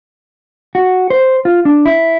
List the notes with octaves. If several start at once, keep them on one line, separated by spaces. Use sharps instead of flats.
F#4
C5
F4
D4
E4